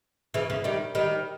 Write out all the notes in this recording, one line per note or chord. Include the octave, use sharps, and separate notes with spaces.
C#3 E3
C#3 E3
D#3 G3
D#3 G3